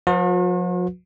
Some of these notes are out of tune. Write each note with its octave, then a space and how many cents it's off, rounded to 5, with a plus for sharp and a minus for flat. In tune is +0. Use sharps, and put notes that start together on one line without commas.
F3 +45 F#4 -45 B4 -5